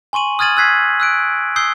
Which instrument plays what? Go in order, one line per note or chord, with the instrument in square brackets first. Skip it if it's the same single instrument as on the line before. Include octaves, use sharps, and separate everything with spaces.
[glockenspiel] G#5 C6 C#6 D#7 F#7
D#6 F6 G#6 A6 D#7 F#7
E6 F#6 G#6 B6 C7
E6 F#6 D7
D#6 E6 G6 C7 G7